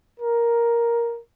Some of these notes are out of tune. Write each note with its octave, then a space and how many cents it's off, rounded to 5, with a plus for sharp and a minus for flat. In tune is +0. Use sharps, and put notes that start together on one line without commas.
A#4 +5